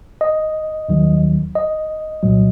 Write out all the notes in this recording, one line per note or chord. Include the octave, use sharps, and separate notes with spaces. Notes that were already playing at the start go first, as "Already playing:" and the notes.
D#5
D#2 D#3 F#3
D#5
C2 A#2 F#3